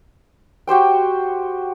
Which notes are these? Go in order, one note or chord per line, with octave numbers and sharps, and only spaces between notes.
F#4 G4 C5 G5